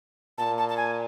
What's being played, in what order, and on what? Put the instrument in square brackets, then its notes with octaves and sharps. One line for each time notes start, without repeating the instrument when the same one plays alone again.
[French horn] A#2 [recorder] A5
[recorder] A5
A5
G#5